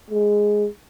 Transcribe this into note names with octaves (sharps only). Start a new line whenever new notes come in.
G#3